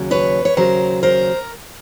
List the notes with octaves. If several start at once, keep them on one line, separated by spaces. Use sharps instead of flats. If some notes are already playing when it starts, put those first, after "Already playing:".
Already playing: D#2 C#3 F#3
B4 C#5
C#5
D#2 C#3 F#3 A#4 C5
A#4 C5